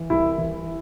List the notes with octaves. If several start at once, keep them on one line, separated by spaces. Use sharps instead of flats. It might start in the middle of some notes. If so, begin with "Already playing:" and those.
Already playing: E3
C2 E4
E3